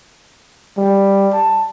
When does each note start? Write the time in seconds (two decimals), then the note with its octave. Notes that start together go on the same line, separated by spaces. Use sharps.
0.78 G3
1.34 A5